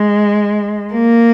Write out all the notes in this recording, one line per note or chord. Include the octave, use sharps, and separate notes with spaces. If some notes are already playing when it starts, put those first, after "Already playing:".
Already playing: G#3
A#3